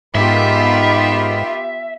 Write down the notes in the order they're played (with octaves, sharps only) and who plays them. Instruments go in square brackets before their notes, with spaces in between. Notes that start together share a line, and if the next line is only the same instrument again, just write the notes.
[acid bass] G#2 [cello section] B3 F4 G4 [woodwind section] D#4 A#4 B5 [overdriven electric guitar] E5